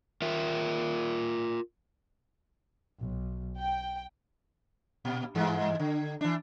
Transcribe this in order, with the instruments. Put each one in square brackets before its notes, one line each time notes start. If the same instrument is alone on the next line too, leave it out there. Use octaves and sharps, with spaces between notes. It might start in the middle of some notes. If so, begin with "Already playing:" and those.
[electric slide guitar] F4 A#4 E5
[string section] B1
G5
[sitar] A#2
G2 E3 G#3
D3
E3 D4